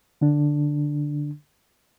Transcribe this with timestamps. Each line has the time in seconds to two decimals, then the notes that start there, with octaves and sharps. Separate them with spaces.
0.21 D3 D4